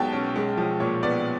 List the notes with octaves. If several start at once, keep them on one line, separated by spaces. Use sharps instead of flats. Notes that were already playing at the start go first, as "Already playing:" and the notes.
Already playing: B1 B2 G#3 G5 A5
C#4
G#3
F3
A#2 C#5
B3 D5